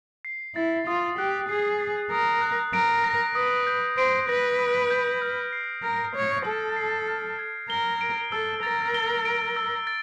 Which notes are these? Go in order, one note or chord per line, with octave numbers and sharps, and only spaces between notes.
C7
E4 A6
F4 D#6
G4 F#6
G#4 C7
A6
A#4 D#6
F#6
A#4 D7
A#6
B4 D#6
G6
C5 D7
B4 A#6
D#6
G6
F6
C7
A#4 F6
C#5 G#6
A4 F6
C7
F6
G#6
A#4 G7
D7
A4 E6
A#4 A6
G7
D7
E6
A6